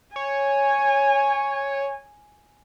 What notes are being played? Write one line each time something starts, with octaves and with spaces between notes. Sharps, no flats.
C#5 G#5